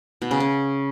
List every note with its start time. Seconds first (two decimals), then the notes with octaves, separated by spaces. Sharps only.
0.22 B2
0.31 C#3
0.40 C#4